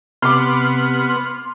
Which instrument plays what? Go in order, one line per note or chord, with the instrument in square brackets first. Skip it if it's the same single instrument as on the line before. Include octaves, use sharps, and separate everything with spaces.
[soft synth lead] C3 [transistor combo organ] B3 [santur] B5 D6 [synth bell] C6 F6